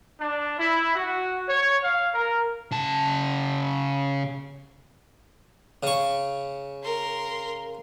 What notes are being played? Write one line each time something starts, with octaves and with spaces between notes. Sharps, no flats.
D4
E4
F#4
C#5
F5
A#4
C#3 A5
C#3 C#6
A#4 C6